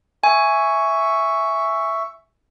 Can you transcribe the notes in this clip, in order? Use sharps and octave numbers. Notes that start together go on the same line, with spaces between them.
E5 G#5 C#6